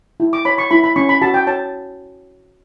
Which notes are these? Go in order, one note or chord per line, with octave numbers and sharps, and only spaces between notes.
E4
D6
C#5 B5
C#6
E4 B5
B5
C#4 C#6
B5
F#4 A5
G5
C#5 A5